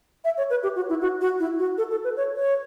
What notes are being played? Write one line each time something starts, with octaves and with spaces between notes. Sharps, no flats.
E5
C#5
B4
G4
F#4
E4
F#4
F#4
E4
F#4
A4
A4
B4
C#5
C#5